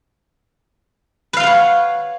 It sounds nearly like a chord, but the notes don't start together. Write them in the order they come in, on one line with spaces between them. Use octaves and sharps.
B4 F5 F4 F#5 C#5